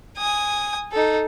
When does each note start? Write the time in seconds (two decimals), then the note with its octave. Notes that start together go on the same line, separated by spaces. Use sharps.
0.17 G#5 D#6
0.92 D#4 A4